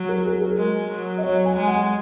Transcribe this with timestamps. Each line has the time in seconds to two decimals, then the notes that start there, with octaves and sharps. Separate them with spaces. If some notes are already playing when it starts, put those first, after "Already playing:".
Already playing: F#3
0.09 A#4
0.25 G#4
0.42 A#4
0.58 G#3
0.91 F#3
1.18 D#5
1.23 F#3 C#5
1.45 G#5
1.57 G#3
1.67 F#5